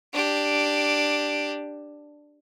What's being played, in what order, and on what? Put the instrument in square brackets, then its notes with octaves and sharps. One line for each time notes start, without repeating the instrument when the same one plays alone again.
[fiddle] D4 G4